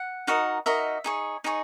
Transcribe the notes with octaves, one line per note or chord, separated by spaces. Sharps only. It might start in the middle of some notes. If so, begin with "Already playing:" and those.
Already playing: F#5
D#4 F#4 A#4 D#5
D#4 F#4 A#4 D#5 E5
D#4 G#4 C#5
D#4 G#4 C#5 D#5